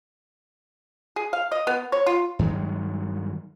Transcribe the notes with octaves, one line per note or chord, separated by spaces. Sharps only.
G#4
F5
D#5
B3
C#5
F4
G2 D#3 F#3 G#3